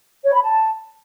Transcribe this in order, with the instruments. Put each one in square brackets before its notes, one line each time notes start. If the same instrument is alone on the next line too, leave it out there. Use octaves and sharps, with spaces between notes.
[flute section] C#5
B5
A5